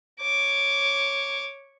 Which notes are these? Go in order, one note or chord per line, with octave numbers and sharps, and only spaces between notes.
C#5 D6